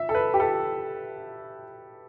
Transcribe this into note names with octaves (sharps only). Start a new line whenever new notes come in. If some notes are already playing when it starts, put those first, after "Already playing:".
Already playing: E5
A4
B4
G4
A4